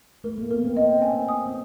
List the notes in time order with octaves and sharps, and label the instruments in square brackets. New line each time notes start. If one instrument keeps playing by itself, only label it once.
[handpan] A3 [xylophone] A#4
[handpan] A#3
[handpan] B3 [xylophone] A#4
[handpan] C4
[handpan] C4 [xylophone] D#5
[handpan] C#4 [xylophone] G#5
[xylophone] D#6
[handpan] C4